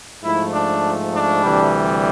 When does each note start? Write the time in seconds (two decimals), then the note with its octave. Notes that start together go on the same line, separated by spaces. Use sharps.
0.23 G#2 F3 A3 E4
0.53 D4
1.13 D4
1.44 D2 C3 E3 G3